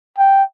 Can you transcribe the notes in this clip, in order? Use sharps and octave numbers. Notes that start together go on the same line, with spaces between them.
G5